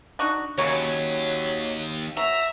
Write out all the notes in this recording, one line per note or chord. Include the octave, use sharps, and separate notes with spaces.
D4 D#4 F#4
D#2 C#3 F#3 A#4 C#5
F#3 E5 A#5